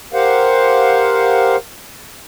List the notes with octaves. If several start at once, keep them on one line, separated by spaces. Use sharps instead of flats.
G4 A#4 C5 F5 F#5